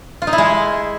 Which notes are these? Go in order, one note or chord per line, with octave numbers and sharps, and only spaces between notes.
F4
D#4
E4
G#3